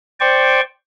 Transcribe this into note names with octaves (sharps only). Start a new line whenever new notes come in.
C5 D5 G5 C#6